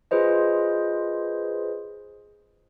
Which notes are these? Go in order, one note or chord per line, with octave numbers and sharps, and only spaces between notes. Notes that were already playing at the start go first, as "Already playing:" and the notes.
F4 G#4 B4 C5 D#5